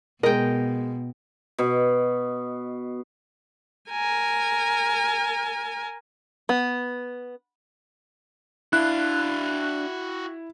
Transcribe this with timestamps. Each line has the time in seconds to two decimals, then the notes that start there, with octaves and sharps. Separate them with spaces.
0.23 B2 G#3 A#4 D#5 G5
1.58 B2
3.90 A#4 G#5
6.49 B3
8.73 D4 E4 F#4 F5 F#6